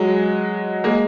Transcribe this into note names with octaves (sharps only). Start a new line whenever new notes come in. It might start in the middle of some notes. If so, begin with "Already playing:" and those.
Already playing: F#3 G#3
G#3 A#3